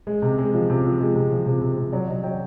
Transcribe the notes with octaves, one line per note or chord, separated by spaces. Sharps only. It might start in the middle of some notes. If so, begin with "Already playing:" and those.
G#3
C3
G#3
F3
C3
F3
G#3
C3
F3
C3
C3
C3
F#3 D5
F#3 D#5
F#3 G5